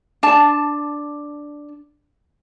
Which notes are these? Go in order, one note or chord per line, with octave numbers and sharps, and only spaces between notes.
D4 A5